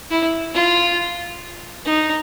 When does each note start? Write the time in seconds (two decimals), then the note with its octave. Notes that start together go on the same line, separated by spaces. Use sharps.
0.11 E4
0.54 F4
1.85 D#4